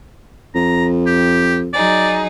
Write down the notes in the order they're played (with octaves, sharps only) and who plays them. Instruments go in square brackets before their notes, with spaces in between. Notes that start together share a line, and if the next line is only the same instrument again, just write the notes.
[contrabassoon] F2 [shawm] A#5
[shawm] G4
[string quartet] F#3 D#4 G#4 [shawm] D5